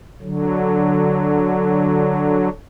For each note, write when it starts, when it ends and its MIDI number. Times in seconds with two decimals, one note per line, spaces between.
0.22 2.49 50
0.22 2.49 54